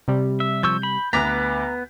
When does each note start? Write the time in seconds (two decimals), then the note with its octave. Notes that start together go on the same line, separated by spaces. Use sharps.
0.08 C3 G3
0.40 E5
0.63 F3 C#6 E6 G6
0.83 B5
1.13 D2 B3 B4 A#5 D6 B6